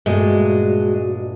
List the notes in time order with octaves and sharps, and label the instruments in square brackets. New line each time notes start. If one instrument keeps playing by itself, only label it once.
[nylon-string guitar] G2 A#2 A3 [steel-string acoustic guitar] G#3 [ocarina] F#4